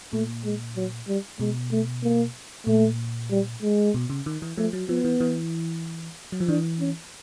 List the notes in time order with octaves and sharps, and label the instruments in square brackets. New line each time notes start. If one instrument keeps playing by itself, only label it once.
[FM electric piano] A#2 [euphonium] A3
[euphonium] G#3
F#3
G3
[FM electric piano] B2 [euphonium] G#3
[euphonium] A3
A#3
[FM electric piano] A#2 [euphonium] A3
[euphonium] G3
G#3
[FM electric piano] B2
C#3
D#3
E3
[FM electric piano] F3 [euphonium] A3
[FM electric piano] F#3
[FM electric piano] F3 [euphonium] B3
[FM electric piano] E3
E3
F#3
F3
[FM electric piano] E3 [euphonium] D4
[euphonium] C#4